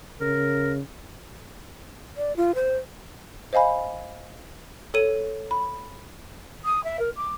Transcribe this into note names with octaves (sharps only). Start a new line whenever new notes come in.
C#3 A#4
D5
F4
C5
C5 D#5 F5 G#5 B5
A4 C#5 D#7
B5
D#6
E5
A#4
D6